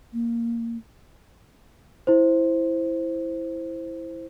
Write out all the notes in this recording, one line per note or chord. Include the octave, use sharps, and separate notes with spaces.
A#3
E4 C5